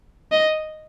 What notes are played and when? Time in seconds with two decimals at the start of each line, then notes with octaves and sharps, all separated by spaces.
0.32 D#5